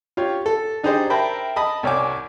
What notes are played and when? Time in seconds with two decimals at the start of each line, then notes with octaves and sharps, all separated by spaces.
0.17 F4 G4 C#5
0.46 A4
0.83 D4 D#4 G4 G#4 C5 D5
1.10 A#4 C5 E5 G5 A5 B5
1.56 D#5 A5 B5 D#6
1.83 C2 G3 C#5 F#5 G#5 D6